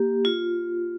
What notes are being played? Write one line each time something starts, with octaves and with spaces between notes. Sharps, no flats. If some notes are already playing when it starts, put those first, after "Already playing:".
Already playing: A#3 G4
F4